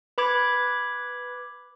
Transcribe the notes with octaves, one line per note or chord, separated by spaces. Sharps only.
B4 B5 D6 G#6